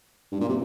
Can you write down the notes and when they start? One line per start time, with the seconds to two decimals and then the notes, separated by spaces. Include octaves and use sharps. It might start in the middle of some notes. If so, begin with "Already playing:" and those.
0.32 G2
0.41 A#2
0.49 C3